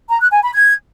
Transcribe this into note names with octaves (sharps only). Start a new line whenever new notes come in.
A#5
F#6
G#5
B5
G#6